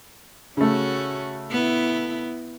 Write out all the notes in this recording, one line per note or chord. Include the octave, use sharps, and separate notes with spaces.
C#3 A3 C#4 F#4
B3 E4